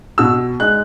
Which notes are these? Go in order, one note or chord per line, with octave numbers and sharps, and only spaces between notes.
B2 E6
G#3 D#4 F#6